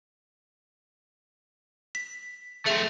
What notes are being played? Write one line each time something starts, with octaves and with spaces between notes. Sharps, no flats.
B6
A3 C4 G#4 E5 F7